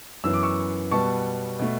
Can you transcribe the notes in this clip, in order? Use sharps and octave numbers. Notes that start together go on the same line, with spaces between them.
F#2 E3 B3 E6
D6
C#6 E6
B2 G3 B3 A5 C#6
B2 A3